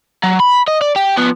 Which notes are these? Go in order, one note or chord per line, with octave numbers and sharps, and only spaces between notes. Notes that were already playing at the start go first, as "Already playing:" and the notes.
F#3
B5
D#5
D5
G4
F3 B3